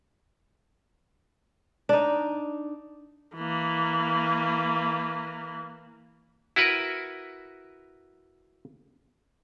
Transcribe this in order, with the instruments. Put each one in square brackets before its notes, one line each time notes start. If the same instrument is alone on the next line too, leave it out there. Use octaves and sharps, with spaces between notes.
[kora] D4 D#4
[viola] E3 A#3
[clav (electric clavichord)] E4 F#4 A#4 B4